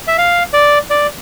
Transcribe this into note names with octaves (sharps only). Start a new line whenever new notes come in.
E5
F5
D5
D5